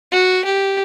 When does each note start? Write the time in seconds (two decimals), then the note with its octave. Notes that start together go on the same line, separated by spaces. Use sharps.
0.12 F#4
0.45 G4